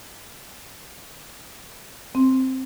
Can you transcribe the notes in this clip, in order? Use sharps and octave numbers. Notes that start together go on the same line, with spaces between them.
C4